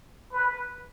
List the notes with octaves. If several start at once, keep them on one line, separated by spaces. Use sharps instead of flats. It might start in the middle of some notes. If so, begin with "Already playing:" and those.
B4